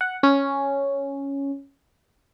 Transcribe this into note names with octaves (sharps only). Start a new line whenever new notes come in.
F#5
C#4